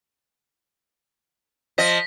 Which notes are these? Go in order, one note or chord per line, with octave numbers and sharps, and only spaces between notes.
F3 D#5 A#6 B6